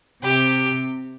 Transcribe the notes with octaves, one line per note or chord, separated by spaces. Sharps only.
C3 G4